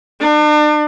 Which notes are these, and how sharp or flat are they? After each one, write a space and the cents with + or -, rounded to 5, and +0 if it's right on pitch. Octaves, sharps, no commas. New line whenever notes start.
D4 +40